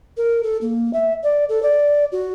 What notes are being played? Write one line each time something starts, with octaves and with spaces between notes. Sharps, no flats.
A#4
A4
A#3
E5
D5
A4
D5
F#4